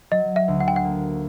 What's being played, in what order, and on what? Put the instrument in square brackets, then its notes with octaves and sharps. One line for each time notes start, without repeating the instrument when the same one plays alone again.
[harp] F#3 [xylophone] D#5
[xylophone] E5
[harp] D2
[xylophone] F#5
G5
F#5
[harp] A#3